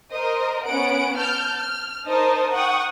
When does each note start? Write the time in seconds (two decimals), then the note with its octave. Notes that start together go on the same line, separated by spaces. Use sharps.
0.11 A#4 C5 D#5
0.67 B3 C#4 F#5 D7
1.15 A5 F6 G6
1.59 F6
2.07 D#4 A#4 C5 D#5 A5
2.53 F#5 G5 C#6 D#6